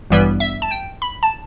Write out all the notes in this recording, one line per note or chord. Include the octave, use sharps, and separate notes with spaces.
A1 G2 E3 G3 B3
E5
A5
G5
B5
A5